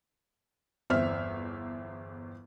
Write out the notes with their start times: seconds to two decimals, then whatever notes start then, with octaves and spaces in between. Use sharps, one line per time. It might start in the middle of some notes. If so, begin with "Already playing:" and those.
0.90 G1 E2 C4 E5 F6